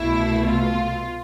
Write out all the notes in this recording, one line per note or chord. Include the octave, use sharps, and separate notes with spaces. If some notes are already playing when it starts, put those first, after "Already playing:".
Already playing: C2 B2 A3 E4
F4